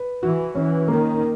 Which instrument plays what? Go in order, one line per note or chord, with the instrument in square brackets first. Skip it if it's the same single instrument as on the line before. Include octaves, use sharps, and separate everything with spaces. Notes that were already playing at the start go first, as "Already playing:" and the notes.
Already playing: [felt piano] B4
[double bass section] E3 [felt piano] F#4
[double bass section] E3 [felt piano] C#4
[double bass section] D#3 [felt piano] A#3